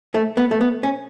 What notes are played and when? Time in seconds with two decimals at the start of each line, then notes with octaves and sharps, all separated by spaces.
0.14 A3
0.37 B3
0.51 A3
0.61 B3
0.83 C#4